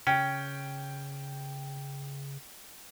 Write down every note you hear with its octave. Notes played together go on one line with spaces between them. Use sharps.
C#3 C#4 G5